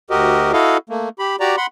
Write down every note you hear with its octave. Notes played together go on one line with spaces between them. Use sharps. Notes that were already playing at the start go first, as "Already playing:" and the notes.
D2 F#4 G4 A#4 D#5
E4 F#4 A4 D#5 F5
A3 A#3
G4 B5
F#4 G4 D5 A#5
F#5 B5 C6